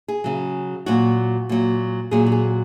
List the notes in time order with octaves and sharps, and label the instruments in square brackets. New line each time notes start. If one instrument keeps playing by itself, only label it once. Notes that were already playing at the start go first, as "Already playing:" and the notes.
[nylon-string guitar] G#4
C#3 F#3
A#2 F#3 F#4
A#2 F#3
A#2 F#3 G#4
F#4
G#4